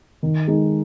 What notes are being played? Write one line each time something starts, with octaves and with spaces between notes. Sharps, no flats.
D#3
G#3 D#4